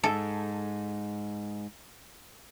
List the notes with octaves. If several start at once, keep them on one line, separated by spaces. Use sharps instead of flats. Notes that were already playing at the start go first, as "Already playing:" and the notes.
G#2 A4